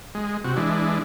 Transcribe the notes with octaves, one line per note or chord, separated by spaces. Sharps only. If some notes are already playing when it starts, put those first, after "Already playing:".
G#3
C3 F#4
E3 G#3 D4